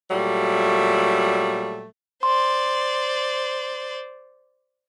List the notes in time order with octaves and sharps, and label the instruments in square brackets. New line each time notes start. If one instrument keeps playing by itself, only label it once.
[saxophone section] A#2 F#3 G3 A3
[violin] C5 D5 [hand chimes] C6